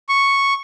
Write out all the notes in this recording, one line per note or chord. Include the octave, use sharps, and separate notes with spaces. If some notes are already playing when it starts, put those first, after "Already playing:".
C#6